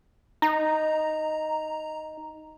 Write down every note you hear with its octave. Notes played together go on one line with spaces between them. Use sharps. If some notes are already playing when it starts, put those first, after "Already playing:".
D#4 A#5